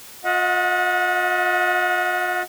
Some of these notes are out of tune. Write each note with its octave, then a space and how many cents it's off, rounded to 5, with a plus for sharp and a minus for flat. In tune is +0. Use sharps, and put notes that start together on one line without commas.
F4 +40 D#5 +35 F#5 -30